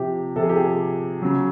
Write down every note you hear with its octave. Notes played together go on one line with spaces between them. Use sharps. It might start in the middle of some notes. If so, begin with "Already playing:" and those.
Already playing: C3 F3 G4
C3 F3 A4
G#4
G4
G#4
C#3 F#3